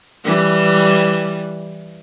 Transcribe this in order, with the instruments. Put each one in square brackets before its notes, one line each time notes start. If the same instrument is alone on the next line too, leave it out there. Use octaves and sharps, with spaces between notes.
[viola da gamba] E3 G3